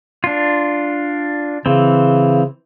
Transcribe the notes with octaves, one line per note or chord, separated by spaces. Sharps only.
D4 F4
C#3 E3 C4